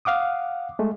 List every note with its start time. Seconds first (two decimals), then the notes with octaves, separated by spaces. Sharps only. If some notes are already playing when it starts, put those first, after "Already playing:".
0.05 F5 F#5 D6 D#6
0.79 G#3 A3